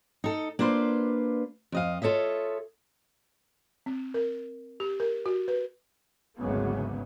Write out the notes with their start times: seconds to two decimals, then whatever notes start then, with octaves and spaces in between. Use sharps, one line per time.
0.24 D#4 A4
0.59 A#3 D4 F4 B4 C5
1.72 F2 D#5 F5
2.02 F4 A4 C#5 D#5 E5
3.86 C4
4.14 A#4
4.80 G4
5.00 A#4
5.26 F#4
5.48 B4
6.37 G#1 D2 C#3 F#3 B3